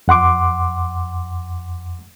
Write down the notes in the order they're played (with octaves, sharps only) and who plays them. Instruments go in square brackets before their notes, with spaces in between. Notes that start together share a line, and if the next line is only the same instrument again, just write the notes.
[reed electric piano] F2 F#5 C6 D6